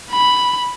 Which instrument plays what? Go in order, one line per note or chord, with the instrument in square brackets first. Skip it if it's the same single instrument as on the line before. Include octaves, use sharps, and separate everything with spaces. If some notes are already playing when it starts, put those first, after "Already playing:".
[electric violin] B5